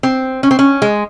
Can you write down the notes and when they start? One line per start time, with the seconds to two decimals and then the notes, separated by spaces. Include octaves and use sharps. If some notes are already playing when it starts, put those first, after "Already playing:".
0.03 C4
0.43 C#4
0.51 C4
0.59 C#4
0.82 G#3